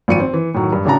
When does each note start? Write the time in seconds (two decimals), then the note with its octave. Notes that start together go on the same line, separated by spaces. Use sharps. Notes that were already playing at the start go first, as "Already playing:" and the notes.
0.08 G#1 F3 C#7 D#7
0.20 C4
0.33 E3
0.54 A2 D#3 F#3
0.73 G2
0.85 A1 C#3 D4 F#4 A5 A#5